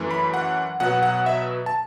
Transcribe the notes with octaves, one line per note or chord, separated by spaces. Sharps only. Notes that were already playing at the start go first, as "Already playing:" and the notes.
Already playing: F#2 E3 A3
B5
F#5
B2 F#3 B3 F#5
F#5
E5
A5